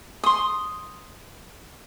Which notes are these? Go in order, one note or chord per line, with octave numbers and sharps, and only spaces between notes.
C6 D#6